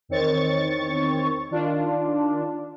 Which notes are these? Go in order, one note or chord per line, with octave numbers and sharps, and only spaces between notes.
E2 D#3 C4 C#5 C#6 A6
D#3 D4 F4